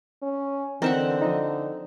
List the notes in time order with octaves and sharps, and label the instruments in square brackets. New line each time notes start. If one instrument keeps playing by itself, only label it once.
[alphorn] C#4
[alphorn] D3 [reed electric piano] E3 D#4 A#4 [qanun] C4 E5 F#5
[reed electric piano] F3 D#4